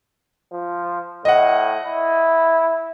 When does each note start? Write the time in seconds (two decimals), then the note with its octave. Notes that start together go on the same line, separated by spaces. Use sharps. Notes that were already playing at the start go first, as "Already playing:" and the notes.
0.52 F3
1.25 A2 D#5 F#5
1.84 E4